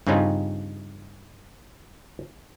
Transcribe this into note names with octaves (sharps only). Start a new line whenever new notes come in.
G2 C#3 C4 C#4 D#4 F4